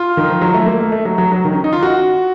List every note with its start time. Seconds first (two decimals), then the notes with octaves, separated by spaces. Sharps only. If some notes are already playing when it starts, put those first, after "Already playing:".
Already playing: F4
0.17 D#3
0.29 F3
0.41 F#3
0.54 A3
0.66 A#3
0.80 A3
0.92 A3
1.05 F#3
1.18 F#3
1.32 F#3
1.45 D#3
1.53 C#4
1.64 D#4
1.73 F4
1.82 F#4